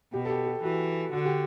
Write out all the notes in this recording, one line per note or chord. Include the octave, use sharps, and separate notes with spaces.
B2 G4
A4
G4
G4
E3 F#4
D3 F#4
G4